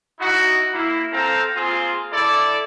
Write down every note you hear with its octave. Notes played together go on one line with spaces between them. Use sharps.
D#4 E4 F#4
A#3 E4
C4 A4 F5 G5 A#5
A#3 C4 F4 G#4
E4 A4 D5